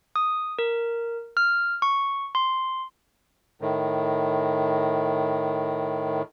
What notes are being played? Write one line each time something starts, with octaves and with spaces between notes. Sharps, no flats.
D#6
A#4
F6
C#6
C6
A2 D#3